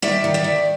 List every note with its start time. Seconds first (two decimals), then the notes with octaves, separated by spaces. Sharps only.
0.02 D#3 D5 E5
0.24 D#3
0.34 D5 E5
0.44 D#3